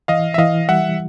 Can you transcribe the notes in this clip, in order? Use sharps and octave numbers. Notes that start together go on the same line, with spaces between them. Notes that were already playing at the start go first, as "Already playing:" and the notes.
E3 D#5 F5
E5
E3 D#5 F5
G3 E5 F#5